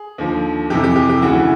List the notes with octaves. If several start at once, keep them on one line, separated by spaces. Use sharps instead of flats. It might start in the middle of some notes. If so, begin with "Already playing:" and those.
Already playing: G#4
D#2 D3 F3
F2 C3 E3 G4
G4
G4
G4
D2 C#3 E3 F#4
E4